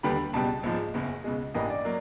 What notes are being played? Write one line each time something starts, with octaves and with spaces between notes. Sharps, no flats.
D#2 D3 G3 B3 B5
C#2 B2 G3 A5
A#1 G#2 F3 G#3
F#1 E2 C#3
C#2 B2 G#3
A1 G2 E3 G3 A#3 D#5
D5
F#3 A#3